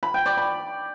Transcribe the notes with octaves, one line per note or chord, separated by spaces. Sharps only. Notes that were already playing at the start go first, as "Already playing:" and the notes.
B5
G5
D5
B5